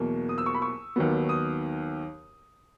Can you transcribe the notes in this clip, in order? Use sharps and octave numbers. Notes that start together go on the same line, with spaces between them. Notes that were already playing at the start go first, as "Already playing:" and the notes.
Already playing: E2 B2 F#3 A#3
D#6
E6
C#6
B5
C#6
D#2 D#3 F#3 B3
D#6